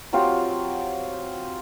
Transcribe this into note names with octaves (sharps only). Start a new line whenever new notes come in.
F#3 C4 F4 G4